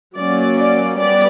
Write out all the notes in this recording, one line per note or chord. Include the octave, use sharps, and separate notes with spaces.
F#3 A#3 C#4 D5
D5
G3 B3 D5